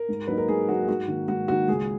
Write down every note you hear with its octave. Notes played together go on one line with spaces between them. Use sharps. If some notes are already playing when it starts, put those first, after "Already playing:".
Already playing: A#4
G#2
F#3 A#3 D#4 B4
A#4
G#2 G#4
F#3 A#3 D#4 F#4
G#4
G#2 F#4
D#3 A#3
G#2 F#4
D#3 A#3 F#4
C#2 G#4